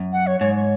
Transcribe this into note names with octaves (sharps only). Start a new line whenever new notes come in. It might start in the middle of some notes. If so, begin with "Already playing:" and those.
Already playing: F#2
F#5
C#5
G#2 C#5
C#5